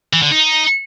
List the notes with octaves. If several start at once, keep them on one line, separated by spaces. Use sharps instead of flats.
E3
D3
D#4